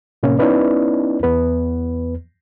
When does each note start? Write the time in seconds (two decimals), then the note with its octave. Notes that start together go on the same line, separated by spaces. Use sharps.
0.23 A2 C3 A#3 C#4
0.39 B3 C#4 D#4 E4 B4 D5
1.23 E2 B3 B4